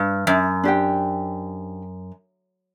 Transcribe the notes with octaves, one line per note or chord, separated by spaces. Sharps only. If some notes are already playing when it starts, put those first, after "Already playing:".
Already playing: G2
F#2
D4 G4 C5 G5